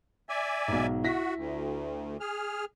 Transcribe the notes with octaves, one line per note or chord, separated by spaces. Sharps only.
D5 E5 G#5
B1 G#2
E4 F#4 A#6 B6
D2
G#4 F6